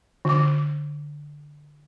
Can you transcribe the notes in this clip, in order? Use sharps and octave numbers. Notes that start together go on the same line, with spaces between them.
D3 D6